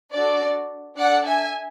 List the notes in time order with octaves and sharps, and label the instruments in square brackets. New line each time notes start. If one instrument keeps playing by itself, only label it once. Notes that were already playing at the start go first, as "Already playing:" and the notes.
[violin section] D4 F#4 A4 D5
D4 A4 D5 F#5
E5 G#5